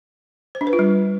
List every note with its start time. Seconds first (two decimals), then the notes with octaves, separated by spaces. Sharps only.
0.55 C5
0.61 D4
0.67 B4
0.73 F4
0.79 G3